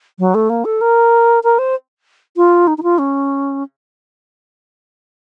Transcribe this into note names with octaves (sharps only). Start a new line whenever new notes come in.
F#3
A3
A#3
A4
A#4
A#4
C5
F4
D#4
D#4
F4
C#4